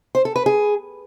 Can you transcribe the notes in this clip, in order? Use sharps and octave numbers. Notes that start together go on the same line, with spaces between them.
C5
A4
B4
G#4